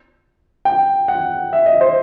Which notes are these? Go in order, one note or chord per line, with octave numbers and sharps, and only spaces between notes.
G5
F#5
E5
D#5
C5